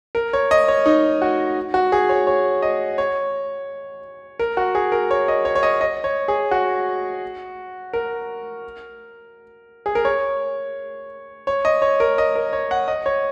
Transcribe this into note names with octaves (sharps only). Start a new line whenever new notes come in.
A#4
C#5
D#5
C#5
D#4
F#4
F#4
G#4
C#5
C#5
D#5
C#5
A#4
F#4
G#4
A#4
C#5
D#5
C#5
C#5
D#5
D#5
C#5
G#4
F#4
A#4
G#4
A#4
C#5
C#5
D#5
C#5
A#4
D#5
A#4
C#5
F#5
D#5
C#5